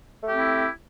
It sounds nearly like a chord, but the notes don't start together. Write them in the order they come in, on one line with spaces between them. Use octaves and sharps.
A3 G4 C4 E4